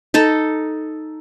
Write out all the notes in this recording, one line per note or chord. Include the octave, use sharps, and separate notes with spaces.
D#4 A4 A5